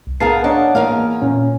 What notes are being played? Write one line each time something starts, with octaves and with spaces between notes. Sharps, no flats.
C2
B3 G#4 A#4 F5 A5 C7
D4 C#5 D#5 F#5
E2 A#3 A#4 F5
A#2 C#4